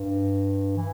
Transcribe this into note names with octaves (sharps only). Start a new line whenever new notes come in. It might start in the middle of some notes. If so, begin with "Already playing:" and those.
Already playing: G2
E3